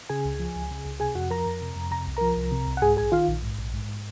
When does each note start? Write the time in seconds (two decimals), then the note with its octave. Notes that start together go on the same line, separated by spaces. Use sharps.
0.09 C#3 G#4 G#5
0.25 C#2
0.39 F3
0.55 C#2
0.71 C#3
0.85 C#2
1.00 C3 G#4 G#5
1.15 F2 F#4 F#5
1.30 F3 A#4 A#5
1.46 F2
1.62 C3
1.76 F2
1.91 C3 A#5
2.07 C2
2.17 F3 A#4 A#5
2.37 C2
2.51 C3
2.67 C2
2.77 F#5
2.82 G#2 G#4 G#5
2.97 A#1 G#4 G#5
3.12 D#3 F4 F5
3.28 A#1
3.42 G#2
3.58 A#1
3.74 G#2